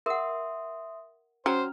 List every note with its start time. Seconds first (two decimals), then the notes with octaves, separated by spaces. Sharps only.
0.06 A#4 E5 F#5 C6 D#6
1.46 F#3 C#4 C5 A#5 F6